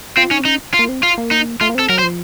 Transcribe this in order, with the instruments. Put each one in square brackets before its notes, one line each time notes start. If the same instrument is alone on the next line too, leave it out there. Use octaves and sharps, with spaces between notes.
[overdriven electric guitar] C4 [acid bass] F4
[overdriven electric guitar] C#4 [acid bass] D#4
[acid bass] C4
[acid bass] C#4 [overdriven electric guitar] D#4
[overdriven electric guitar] F4
[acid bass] A#3
C4
[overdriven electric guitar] F4
[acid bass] A#3
[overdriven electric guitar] D#4
[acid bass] A3 [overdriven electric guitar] F4
[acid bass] A#3
[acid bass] C4 [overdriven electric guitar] A4
[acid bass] F#3 [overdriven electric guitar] A#4
[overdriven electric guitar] C5
[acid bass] F3